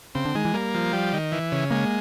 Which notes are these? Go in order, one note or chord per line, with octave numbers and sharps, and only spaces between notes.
C#3 C4
D3
D#3 G#3
E3
G3 A#3
F3
G3
D#3
E3
C#3
G#3 A#3